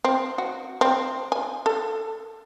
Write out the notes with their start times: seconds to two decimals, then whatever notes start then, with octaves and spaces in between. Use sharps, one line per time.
0.05 C4
0.38 F#4
0.81 C4
1.32 G#5
1.66 A4